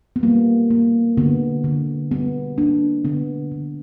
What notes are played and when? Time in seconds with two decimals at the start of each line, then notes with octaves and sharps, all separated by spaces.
0.16 B3
0.23 G3 A#3
0.70 A#3
1.17 D3 B3
1.64 D3
2.11 G3 B3
2.58 A#3 B3 D4
3.05 D3 B3
3.52 D3